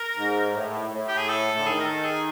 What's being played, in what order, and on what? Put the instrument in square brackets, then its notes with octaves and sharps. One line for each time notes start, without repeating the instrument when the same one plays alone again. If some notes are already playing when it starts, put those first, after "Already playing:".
Already playing: [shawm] A#4
[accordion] G#2
A2
A2
[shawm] G4
G#4
A4
[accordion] D3
[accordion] D#3 [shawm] G#4
[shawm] A#4
A4
G#4